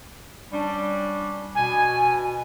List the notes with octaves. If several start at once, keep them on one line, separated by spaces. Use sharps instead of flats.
G3 C#4 D4
B2 G#5